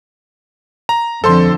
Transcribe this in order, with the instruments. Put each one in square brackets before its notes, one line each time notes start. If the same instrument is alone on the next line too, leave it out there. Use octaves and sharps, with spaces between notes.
[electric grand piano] A#5
[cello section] F2 D3 [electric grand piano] A4 C5 C6